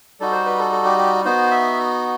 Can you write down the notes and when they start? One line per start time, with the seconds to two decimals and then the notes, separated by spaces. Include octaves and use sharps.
0.20 G3 D#4 F#4 A4
0.32 C5
0.46 B4
0.59 A4
0.72 A4
0.85 G4
0.98 G4
1.25 B3 D#4 F#4 C5
1.51 E5